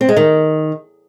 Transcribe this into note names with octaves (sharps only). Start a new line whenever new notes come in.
C4
G#3
D#3